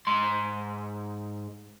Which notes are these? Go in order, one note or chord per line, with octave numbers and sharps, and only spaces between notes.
G#2 C6